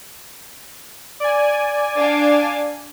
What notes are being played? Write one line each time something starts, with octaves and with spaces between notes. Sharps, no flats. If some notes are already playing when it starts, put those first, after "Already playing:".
D5 G#5
D4 F5